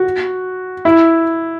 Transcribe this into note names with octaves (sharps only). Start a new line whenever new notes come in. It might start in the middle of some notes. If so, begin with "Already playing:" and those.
Already playing: F#4
E4